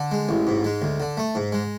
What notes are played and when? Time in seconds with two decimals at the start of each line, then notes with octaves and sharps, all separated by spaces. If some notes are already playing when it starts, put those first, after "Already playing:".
Already playing: D3
0.11 G#3
0.29 A1
0.47 G#2
0.64 G#3
0.82 D2
1.00 D3
1.17 A3
1.35 G#2
1.52 G#3